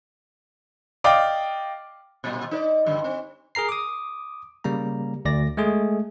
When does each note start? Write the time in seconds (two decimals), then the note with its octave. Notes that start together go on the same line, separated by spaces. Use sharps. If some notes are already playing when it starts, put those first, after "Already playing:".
1.04 D5 D#5 F5 G5 D6
2.24 A#2 G3
2.51 D#4 B4 D5
2.86 G2 D3
3.04 C4
3.55 G#4 A#4 A#5 C7
3.69 D6 D#6
4.64 C#3 G3 A#3 A#5
5.25 D2 D5 A#6
5.57 G#3 A3 G#4